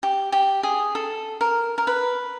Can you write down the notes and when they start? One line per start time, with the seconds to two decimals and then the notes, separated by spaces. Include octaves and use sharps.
0.03 G4
0.32 G4
0.63 G#4
0.95 A4
1.41 A#4
1.78 A#4
1.87 B4